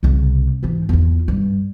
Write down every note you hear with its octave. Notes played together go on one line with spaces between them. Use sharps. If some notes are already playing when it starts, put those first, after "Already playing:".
C2 C#3
G#2 E3
E2 F4
G2